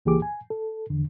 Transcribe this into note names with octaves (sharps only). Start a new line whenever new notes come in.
C#2 E3 A#3 G4 G#4 D6
G#5
A4
E2 D3